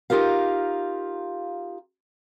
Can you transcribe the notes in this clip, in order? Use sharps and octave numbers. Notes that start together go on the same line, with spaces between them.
D#4 F4 G4 A#4 F5